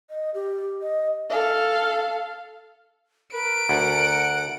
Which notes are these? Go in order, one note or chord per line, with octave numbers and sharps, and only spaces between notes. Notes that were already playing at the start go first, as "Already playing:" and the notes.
D#5
G4
D#5
A4 F5
A#4 B4 D7
D2 F#5